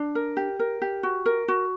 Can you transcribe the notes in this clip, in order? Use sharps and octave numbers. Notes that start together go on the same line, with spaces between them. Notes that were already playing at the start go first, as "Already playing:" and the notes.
Already playing: D4
A#4
G4
A#4
G4
F#4
A#4
F#4